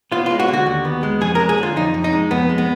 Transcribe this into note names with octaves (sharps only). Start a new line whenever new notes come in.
B3 F4
G#3 F4
F#4
D3
F#4
D#2
B3
G#3
F2 G#4
A#4
G#3
G#4
D3 F4
F2 D#4
F2
D#4
G#3
F2 B3
G#3
B3